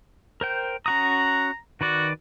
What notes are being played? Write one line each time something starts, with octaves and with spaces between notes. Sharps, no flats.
A#4 C5 G5
C#4 F#4 A#5 D#6
D#3 F#4 B4 D5